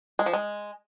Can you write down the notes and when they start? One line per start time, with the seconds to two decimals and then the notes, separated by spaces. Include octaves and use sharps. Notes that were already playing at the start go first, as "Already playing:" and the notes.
0.19 G#3
0.26 F3
0.33 G#3